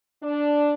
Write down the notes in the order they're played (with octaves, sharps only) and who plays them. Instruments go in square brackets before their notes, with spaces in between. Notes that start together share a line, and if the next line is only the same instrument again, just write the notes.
[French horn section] D4